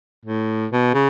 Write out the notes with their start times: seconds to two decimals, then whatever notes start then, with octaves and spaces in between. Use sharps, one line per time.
0.25 A2
0.72 B2
0.94 C#3